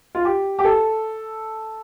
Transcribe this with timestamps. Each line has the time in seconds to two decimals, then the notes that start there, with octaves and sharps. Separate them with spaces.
0.15 F4
0.25 G4
0.59 G4
0.65 A4